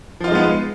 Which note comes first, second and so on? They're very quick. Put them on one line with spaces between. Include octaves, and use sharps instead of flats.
F3 F4 D#4 G#3 B3